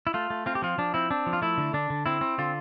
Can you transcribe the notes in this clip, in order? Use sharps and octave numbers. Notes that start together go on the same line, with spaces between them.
E4
A3 F4
A3
C4 F4
G4
F3 F4
F3 D4
C4 E4
C4 D4
F3
F4
A3 E4
D3
D3 D4
D3
C4 E4
C4
D3 F4